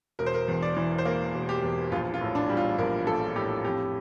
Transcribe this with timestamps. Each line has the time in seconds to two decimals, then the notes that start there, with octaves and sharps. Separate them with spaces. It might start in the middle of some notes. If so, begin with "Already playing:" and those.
0.19 E1 A#4
0.26 C5
0.34 A#4
0.48 E2
0.63 D5
0.76 E3
0.98 C5
1.05 A#3 A#4
1.34 E1
1.49 G4
1.63 E2
1.92 A#1 F4
2.14 F4
2.21 A2
2.35 D4
2.49 G3
2.57 F4
2.78 A#1 A#4
3.07 A#1 A4
3.36 A2 G4
3.65 F2 G4